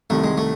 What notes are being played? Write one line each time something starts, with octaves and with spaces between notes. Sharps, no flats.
C2 C3 D#3 A3
G#3
A3